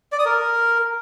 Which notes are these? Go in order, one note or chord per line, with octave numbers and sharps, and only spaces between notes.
D5
D#6
A#4